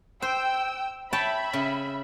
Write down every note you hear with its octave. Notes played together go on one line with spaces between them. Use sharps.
C5 G5 E6
C#5 E5 G5 A5 B5
C#3